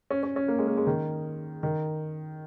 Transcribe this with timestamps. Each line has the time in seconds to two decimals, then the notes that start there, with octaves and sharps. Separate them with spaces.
0.10 C#4
0.23 C#4
0.36 C#4
0.48 A#3
0.58 G#3
0.67 A#3
0.77 G#3
0.87 D#3
1.63 D#3